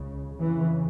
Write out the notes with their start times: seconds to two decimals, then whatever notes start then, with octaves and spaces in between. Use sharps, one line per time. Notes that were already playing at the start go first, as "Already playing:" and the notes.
Already playing: C#2 C#3
0.39 F2 C#3 E3